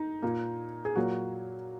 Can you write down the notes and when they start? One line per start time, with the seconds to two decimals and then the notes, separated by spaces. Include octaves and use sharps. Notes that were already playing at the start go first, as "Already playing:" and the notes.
Already playing: D#4
0.22 A#2 A#3
0.85 G#4
0.95 A#2 F#3 A#3 F#4